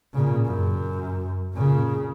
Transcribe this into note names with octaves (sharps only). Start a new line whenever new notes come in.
A#2 C#3
F#2
A#2 C#3